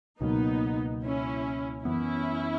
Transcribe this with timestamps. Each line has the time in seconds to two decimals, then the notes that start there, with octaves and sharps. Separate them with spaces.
0.20 C#2 B2 F#3 A#3 B3 D#4
1.03 C#4 E4
1.85 F#2 E3 B3 C#4 E4